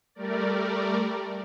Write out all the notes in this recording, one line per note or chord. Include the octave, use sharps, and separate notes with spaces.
G3 A3 A#4 D5